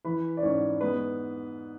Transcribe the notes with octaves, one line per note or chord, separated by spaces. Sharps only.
E3 B4 B5
D5
G#2 C#4 C#5
G#3 B3 B4